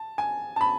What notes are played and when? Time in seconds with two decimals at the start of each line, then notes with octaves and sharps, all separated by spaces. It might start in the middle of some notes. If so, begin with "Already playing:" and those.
Already playing: A5
0.18 G#5
0.56 A5
0.61 B5